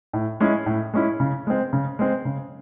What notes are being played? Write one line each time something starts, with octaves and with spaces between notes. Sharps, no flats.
A2
G#3 C#4 E4
A2
G#3 C#4 E4
C#3
G#3 C4
C#3
G#3 C4
C#3